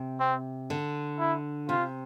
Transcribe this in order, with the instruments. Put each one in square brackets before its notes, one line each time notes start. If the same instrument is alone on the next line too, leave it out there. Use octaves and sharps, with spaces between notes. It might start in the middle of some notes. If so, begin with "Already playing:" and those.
Already playing: [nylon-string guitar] C3
[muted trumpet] C4
[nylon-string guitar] D3
[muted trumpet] E4
[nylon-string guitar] C3 [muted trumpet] F4